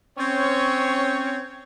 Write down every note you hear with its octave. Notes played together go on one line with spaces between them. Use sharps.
C4 C#4 C#5